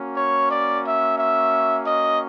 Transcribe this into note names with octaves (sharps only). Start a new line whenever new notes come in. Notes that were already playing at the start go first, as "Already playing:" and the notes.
Already playing: A#3 C#4 F#4
C#5
D5
E5
E5
D#5